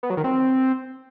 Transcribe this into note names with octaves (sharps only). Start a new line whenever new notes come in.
B3
F#3
D#3
C4